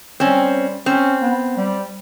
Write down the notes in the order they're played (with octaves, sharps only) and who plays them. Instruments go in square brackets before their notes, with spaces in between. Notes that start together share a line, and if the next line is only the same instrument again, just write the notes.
[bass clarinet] G3 [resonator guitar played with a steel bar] C4 C#4
[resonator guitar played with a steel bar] C4 [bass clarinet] C#4
[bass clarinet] B3
G3